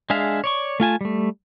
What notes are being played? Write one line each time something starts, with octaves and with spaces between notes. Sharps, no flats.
G#3 D4 G#4 E5 F5
C#5 D5 C#6
A3 F4 G#5 A5
G3 A3